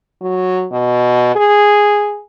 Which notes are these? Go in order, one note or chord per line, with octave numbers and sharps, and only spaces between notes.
F#3
B2
G#4